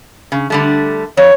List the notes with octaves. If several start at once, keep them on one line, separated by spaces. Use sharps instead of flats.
C#3
D3 G3 A3
F2 C#5